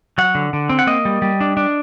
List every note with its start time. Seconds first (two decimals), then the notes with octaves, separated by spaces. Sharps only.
0.18 F#3 F#5
0.35 D3
0.53 D3
0.69 C4
0.79 F#5
0.87 A#3 D#5
1.05 G3
1.22 G3
1.40 D4
1.57 D4